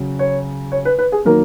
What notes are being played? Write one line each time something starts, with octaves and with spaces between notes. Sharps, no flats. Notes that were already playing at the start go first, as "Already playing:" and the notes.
Already playing: C#3 F#3
C#5
C#5
B4
B4
G#4
D#3 F#3 A#3 A#4